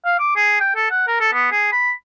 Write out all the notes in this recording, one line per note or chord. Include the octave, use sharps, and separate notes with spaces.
F5
D6
G#4
G5
A4
F#5
A#4
A4
B3
G#4
B5